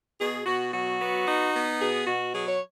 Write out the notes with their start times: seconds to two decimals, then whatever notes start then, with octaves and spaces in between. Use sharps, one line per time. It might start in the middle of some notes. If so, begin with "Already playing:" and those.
0.19 B2 G#4
0.46 B2 F#4
0.72 F#3 F#4
1.00 B3
1.27 D#4
1.53 B3
1.79 B2 G#4
2.06 B2 F#4
2.33 F#3 G#4
2.47 C#5